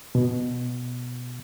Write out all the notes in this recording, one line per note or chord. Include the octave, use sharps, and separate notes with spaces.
B2